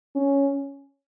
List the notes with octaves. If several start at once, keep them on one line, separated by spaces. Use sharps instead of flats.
C#4